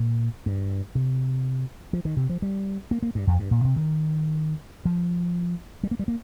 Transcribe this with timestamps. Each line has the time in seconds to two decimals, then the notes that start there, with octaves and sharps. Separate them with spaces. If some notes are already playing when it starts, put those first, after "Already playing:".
Already playing: A#2
0.46 G2
0.95 C3
1.93 F3
2.05 D#3
2.17 C3
2.30 F3
2.42 G3
2.91 A#3
3.03 A#3
3.15 G2
3.27 F2
3.39 G2
3.51 A#2
3.64 C3
3.76 D#3
4.85 F3
5.83 G3
5.91 A#3
5.99 G3
6.08 A#3